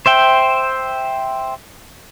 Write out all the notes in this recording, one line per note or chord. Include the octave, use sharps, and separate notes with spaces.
C5 E5 G5